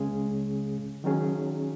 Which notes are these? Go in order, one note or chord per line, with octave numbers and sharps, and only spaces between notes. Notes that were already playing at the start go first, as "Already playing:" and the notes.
Already playing: C#2 C#3 G#3 C#4 G#4
D#3 F#3 C#4 G#4